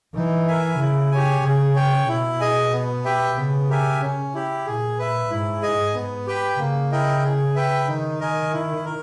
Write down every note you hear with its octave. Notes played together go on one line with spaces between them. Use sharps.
E3 D#4
A#4 E5 G#5
C#3 E4
G4 C#5 G#5
C#3 G#4
C#5 G5
B2 E4
G#4 D#5 G#5
B3
G4 B4 E5 G5
C#3 B3
G4 A#4 E5 G#5
C#4
E4 G4
A#2 G#4
B4 E5
G#2 E4
G#4 D#5 G#5
B3
G4 B4 G5
C#3 A#3
E4 A#4 D#5 G5
G#4
B4 E5 G5
D#3 D#4
A#4 D#5 G#5
E4
A#4